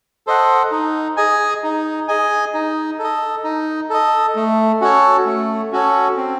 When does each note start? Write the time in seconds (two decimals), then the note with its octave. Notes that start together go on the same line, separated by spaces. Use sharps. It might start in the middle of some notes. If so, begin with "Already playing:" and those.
0.27 A4 C5 D#5 F#5
0.71 D#4
1.17 G#4 D#5 G#5
1.63 D#4
2.08 G#4 D#5 G#5
2.54 D#4
2.99 A4
3.04 D#5
3.44 D#4
3.90 A4 D#5
4.36 A3
4.81 C#4 F#4 A4 C#5
5.25 A3
5.72 C#4 F#4 A4 C#5
6.16 C4